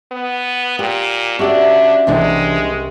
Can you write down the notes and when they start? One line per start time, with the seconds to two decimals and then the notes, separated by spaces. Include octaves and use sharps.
0.12 B3
0.79 A#2 G4
1.39 C#4 D4 F#4 G4 D5 E5 F#5
2.07 C2 C3 E3 G#3 B3 D4